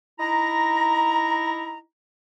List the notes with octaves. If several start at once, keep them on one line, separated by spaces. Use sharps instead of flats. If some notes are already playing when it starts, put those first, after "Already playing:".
D#4 E4 A#5